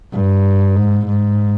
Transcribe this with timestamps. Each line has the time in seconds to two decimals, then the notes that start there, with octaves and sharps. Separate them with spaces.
0.13 G2
0.76 G#2
1.07 G#2